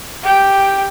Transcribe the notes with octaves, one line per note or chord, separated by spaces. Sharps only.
G4 G5